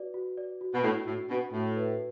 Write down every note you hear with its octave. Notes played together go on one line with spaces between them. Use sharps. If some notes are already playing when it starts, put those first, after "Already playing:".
Already playing: F#4 B4 D5
F#4
D5
F#4
B2
A2 D4
A2 F#4
B2 D4
A2 F#4
B4